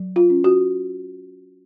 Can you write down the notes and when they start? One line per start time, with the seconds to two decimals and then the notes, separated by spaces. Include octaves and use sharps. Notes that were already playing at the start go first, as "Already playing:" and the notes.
Already playing: F#3
0.16 F4
0.30 C#4
0.44 F#4